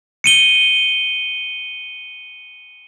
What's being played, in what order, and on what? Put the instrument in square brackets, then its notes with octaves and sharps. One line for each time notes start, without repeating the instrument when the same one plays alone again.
[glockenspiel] C#7 D#7 G7